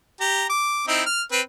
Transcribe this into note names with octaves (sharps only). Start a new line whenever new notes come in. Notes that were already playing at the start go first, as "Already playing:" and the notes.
G4 A#5
D6
C4 D#4 E4
F6
C4 B4